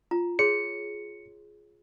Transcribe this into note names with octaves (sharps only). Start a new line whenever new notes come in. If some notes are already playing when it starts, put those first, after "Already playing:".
F4 A#5
G#4 C#5 C6 C#7